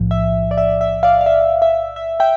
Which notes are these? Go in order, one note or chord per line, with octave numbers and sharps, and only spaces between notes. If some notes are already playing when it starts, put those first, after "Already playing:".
Already playing: B1 A2 F3
E5
D5
E5
E5
D5 F5
F5
E5
E5
E5
E5 G5